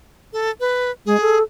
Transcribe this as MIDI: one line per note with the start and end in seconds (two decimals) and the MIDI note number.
0.33 0.50 69
0.60 0.91 71
1.06 1.20 56
1.06 1.38 68
1.21 1.42 69